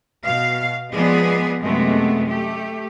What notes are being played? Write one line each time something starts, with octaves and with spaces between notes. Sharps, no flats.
B2 F5
F3 G#3 B3 G#4 D5
F#2 C3 G#3 A3 B3
A3 G4